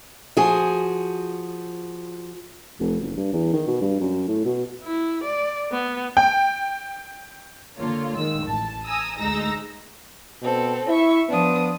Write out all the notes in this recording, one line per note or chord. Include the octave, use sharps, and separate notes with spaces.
F3 F#4 G#4
F1
F#1
G2
E2
D#3
B2
G2
F#2
A2
B2
E4
D5
B3
G5
D3 A#3 F4 C#5
D#3 G#3 E6
A1 A5
G#5 A#5 D#6 E6
D2 G#3 D#4 A#5 E6 A#6
B2 C4 A4
E4 E5 C#6
F3 B3 D4 D#6